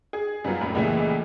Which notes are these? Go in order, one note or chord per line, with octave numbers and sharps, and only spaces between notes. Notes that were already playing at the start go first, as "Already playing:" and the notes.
G#4
F#2 G3 B3 F4
F1 A2
C#2 A#2 E3 G#3 A3